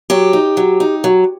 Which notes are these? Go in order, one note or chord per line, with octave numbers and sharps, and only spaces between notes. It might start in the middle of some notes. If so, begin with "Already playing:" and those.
F#3 G4
D#4
F#3
D#4
F#3